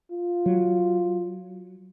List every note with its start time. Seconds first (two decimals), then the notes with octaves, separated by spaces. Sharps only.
0.11 F4
0.46 F#3